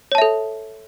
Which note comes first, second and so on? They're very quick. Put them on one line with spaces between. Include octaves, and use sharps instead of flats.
C#5 A5 E5 A4